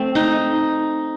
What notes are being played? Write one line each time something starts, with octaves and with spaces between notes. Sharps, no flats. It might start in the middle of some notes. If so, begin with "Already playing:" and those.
Already playing: A3 C4
D#4